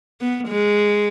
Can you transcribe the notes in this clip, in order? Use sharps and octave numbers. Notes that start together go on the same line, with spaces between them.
B3
G#3